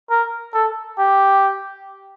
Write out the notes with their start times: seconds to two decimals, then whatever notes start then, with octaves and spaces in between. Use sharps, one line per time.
0.10 A#4
0.54 A4
0.98 G4